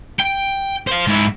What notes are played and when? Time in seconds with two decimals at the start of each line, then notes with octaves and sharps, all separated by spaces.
0.20 G5
0.87 C5 F5
1.07 G#2 E4